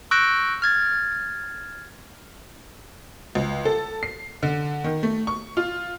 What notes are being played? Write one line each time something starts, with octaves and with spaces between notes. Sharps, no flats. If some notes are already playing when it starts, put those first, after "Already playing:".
C#6 E6 F#6 G6 A#6 D7
F6 G#6 A6
C#2
A4
C7
D3
D#3
A3
C#6
F4